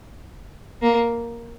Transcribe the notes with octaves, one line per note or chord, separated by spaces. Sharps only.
A#3